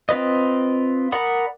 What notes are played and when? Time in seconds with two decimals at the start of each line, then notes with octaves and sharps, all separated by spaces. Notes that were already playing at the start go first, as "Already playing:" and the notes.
0.09 C4 F4 B4 D#5
1.12 A#4 D5 F#5 B5 D#6